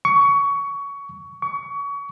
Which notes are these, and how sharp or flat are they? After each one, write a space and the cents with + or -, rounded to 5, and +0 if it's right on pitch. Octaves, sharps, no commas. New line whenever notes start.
C#6 +20
C#6 +30